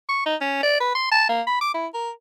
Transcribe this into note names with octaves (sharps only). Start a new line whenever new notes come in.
C#6
D#4
C#4
D5
B4
C6
A5
A#3
B5
D6
E4
A#4